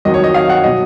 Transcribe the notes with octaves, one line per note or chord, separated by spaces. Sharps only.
F2 D#3 F#3 D#5
C#5
D#5
F5
F#5
B2 F#3 D#5